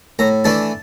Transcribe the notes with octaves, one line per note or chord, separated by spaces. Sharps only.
A2 A#5
E3 A3 D4 A5